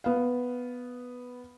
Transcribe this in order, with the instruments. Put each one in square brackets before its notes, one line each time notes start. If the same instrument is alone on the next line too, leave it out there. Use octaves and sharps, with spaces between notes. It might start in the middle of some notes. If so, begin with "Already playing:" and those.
[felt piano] B3 F5